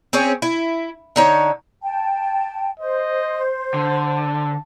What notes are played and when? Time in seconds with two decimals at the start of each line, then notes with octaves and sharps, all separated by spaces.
0.13 C4 C#4 G#4 C#5
0.42 E4
1.16 D3 D#4 C#5
1.83 G5 A5
2.80 C5 D#5
3.74 D3 A5